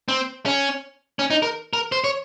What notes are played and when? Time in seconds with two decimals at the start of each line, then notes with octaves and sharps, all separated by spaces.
0.08 C4
0.46 C#4
1.19 C#4
1.30 D#4
1.42 A#4
1.73 A#4
1.92 C5
2.04 C#5